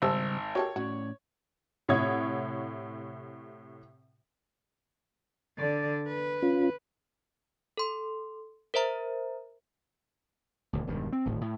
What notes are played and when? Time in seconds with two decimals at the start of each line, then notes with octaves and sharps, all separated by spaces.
0.02 G#1 C#3 G3 D#4 G4 C5 A5 E6
0.55 F#4 G4 A4 A#4 C#5
0.76 A2 C#4 F#4 D5
1.88 A2 C3 C#5 F#5 D#6 G#6
5.58 D3 D5
6.07 B4
6.43 C#4 F4
7.77 A4 C6
8.74 A#4 C5 E5 A#5
10.73 D#1 D2
10.87 E1 G2 D#3
11.13 C4
11.25 D1 G#1 A2
11.41 A2